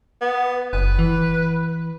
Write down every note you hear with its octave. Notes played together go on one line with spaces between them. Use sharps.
B3
F#1 B4
E3